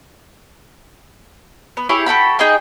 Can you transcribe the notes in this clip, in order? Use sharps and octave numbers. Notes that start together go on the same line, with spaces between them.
B3
E4 G4 G#4 C#5
F#4 A4 G5 B5
D#4 G#4 D#5 G5